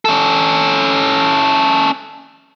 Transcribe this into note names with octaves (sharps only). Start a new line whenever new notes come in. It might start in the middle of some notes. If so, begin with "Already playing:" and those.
C#4 A4